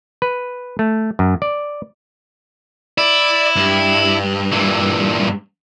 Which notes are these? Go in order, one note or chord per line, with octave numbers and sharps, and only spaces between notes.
B4
A3
F#2
D5
E4 D5
G2
A#2 E3